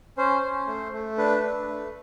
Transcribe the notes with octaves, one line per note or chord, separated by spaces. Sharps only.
C#4 C5
C#4
A3
A3
D4 B4
D4
A3